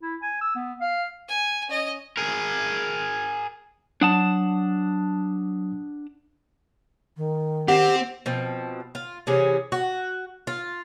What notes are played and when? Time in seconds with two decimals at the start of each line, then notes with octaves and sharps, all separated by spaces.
0.03 E4
0.22 G#5
0.41 E6
0.55 B3
0.81 F5
1.28 G#5
1.69 C#4 D#5
2.17 G#4 A#4
4.01 F#3 D4 F#5 A5 D#6
7.17 D#3
7.68 C4 G4 F#5
8.26 B2 F3 C4
8.95 F4
9.27 C3 E3 C#4 G#4
9.72 F#4
10.47 F4